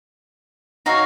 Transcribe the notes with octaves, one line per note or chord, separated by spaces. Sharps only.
D#4 F#4 C#5 F5